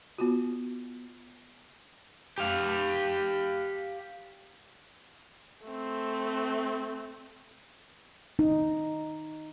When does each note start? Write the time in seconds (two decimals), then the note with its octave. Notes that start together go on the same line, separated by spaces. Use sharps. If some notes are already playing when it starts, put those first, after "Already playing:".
0.18 B3 F4 F#4
2.38 G4 F5
5.66 A3 C4
8.39 D#4